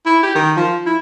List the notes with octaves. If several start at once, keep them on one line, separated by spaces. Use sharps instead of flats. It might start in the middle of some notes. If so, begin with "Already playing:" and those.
E4
G4
D#3
F3
E4